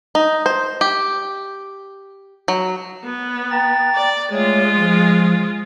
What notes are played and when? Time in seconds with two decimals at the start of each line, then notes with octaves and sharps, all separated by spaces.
0.15 D#4
0.46 C5
0.81 G4
2.48 F#3
3.05 B3
3.51 G5 A#5 A6
3.95 D5
4.32 G#3 A3 F4 C#5
4.76 F3